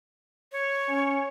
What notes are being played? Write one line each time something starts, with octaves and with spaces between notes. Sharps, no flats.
C#5
C#4